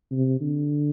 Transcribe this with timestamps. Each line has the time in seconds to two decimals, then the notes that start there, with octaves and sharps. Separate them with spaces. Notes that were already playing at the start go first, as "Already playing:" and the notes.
0.12 C3
0.41 D3